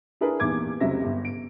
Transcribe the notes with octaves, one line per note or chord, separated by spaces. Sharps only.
D4 E4 G#4 A#4 B4
D#1 E2 D#4 D6 G#6
F1 C#2 C3 F#3 E5 A#6
G1
D7